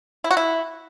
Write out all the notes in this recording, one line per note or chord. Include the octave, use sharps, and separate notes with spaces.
E4
F#4
E4